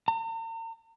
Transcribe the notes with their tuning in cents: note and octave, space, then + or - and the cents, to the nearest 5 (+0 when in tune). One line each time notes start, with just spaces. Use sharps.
A#5 -45